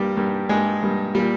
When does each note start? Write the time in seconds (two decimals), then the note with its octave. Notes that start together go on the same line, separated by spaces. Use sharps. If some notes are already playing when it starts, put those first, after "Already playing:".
Already playing: G2 G3 A#3 G4
0.17 G2 G3 A#3
0.49 G2 G3 G#3 A#3 G#4
0.83 G2 G3 A#3
1.14 A#2 G3 A#3 G4